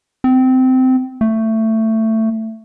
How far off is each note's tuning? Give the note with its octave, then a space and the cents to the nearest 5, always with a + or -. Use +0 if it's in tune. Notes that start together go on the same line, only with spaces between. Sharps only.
C4 -20
A3 +15